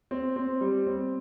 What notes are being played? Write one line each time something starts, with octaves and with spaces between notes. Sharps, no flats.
C4
C4
G3
C4